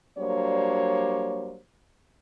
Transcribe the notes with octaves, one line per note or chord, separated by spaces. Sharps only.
F#3 G3 A#3 D4 C5 C#5